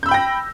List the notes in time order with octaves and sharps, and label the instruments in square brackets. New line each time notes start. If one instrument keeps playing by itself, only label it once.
[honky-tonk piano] G6
E6
B5
G5
A#6